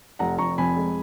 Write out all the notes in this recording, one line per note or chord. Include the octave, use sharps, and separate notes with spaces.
F1 F#5 A#5
F1 A#5 C#6
F2 G#5 B5
G#3